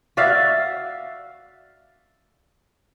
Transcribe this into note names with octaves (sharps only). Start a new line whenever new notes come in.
F#4 D5 E5 F5